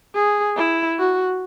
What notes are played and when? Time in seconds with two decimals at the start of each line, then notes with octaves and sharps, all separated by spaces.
0.15 G#4
0.57 E4
0.99 F#4